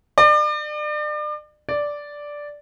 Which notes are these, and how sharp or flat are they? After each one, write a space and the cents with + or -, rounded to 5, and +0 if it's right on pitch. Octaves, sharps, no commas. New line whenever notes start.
D5 +35
D5 -5